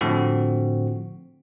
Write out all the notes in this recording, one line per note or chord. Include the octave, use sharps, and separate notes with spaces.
A2 D3 F3 C4 F#4